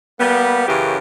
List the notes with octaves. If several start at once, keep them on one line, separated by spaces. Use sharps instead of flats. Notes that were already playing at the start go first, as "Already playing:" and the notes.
G3 A#3 B3
F#2 C#3 E3 G4 A#4